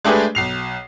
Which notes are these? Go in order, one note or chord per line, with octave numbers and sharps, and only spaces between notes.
G#3 A3 D4 G4 G#4 B4
B1 C7 F7